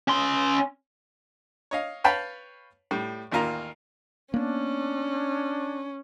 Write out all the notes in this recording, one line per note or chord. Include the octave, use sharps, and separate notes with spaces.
C#4 C6
C#5 D#5 F5
B4 C#5 F5 G5 A5 B5
A2 G3
A1 D#2 A#3 F4 A#5
A#3 B3 C#4 D4